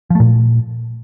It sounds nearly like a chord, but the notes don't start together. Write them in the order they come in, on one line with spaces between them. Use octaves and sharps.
F3 A3 A#2